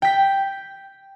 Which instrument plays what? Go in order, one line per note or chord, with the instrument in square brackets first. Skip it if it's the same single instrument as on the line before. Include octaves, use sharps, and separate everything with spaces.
[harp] G5 B6